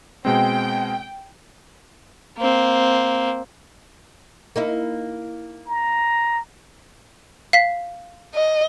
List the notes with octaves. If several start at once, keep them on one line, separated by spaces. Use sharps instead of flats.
B2 G#3 C4 G5
A#3 C4
A#3 D#4 E4
A#5
F5 B6
D#5